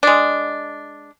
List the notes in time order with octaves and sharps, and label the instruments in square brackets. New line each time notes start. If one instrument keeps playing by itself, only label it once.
[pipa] G#3 D4